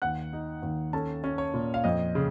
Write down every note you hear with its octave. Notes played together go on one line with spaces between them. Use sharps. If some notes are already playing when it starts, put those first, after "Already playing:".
D#2 F#5 F#6
D#4
D#2
C#4 A4 A5
C#4
C#5
A#2
F5
F2 D#5
C#3